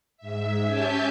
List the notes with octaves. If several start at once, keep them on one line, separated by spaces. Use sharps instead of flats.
G#2 E5
C#4 G4 E5 G#5 A5 G6